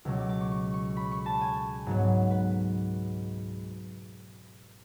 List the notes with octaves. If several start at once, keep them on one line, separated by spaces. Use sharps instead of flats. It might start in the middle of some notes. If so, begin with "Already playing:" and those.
C#2 B2 F#3 C#6
D6
D6
C#6
C#6
C#6
B5
C#6
A5
G#5
G#2 F#3 B3
B4